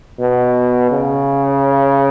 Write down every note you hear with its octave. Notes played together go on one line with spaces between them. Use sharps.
B2
C#3